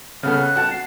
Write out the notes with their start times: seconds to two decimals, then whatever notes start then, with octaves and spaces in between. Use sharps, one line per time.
0.23 C#3 B3 A4 F6
0.41 F#6
0.56 F#4 F#5 A5
0.71 C7